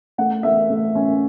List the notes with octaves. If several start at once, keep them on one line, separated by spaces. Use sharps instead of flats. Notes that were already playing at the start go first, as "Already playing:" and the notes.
A3 F#5
A3 E5
A3
C#4